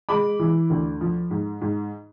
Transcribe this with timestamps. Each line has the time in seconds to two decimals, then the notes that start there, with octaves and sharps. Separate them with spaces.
0.09 G#3 B5 D6
0.39 E3
0.70 D2
1.01 F3
1.31 G#2
1.61 G#2